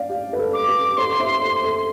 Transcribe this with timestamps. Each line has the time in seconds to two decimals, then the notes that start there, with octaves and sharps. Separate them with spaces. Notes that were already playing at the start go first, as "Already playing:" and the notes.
Already playing: D5 F5
0.09 G4
0.33 B4
0.39 A4
0.54 D6
0.68 G4 B4
0.97 A4 C5 C6
1.20 C5 E5
1.41 A4 C5
1.63 A4